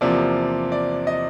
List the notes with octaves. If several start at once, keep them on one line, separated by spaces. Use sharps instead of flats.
E2 C3 F3 A#3 D5
D5
D#5